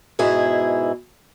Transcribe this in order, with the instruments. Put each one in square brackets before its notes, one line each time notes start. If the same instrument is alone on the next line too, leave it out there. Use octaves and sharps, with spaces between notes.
[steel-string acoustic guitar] G#2 B2 E4 G#4